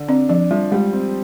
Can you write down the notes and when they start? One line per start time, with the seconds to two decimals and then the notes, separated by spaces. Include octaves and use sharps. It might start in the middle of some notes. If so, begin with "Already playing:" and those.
Already playing: D3
0.08 C4 D4
0.29 F3 D4
0.51 F3 G3
0.72 G3 G#3
0.93 C4